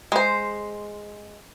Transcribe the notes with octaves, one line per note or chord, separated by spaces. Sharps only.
G#3 C5